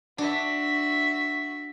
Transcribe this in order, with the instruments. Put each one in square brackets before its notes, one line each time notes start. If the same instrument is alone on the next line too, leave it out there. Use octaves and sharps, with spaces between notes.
[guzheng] D4 [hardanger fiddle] F#4 E5